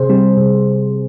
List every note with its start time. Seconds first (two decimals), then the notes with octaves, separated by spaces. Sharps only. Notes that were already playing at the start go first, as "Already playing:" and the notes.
Already playing: C3 G#4 C5
0.10 G3 C4
0.38 C3